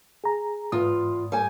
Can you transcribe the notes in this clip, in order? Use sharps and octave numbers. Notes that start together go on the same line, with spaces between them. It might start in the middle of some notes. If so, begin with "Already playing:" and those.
G#4 A#5
E2 G#2 F4 D#6
G3 G#5